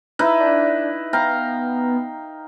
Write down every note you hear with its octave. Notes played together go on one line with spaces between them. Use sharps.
D#4 E4 B4 E5
D4
B3 F5 G5 A#5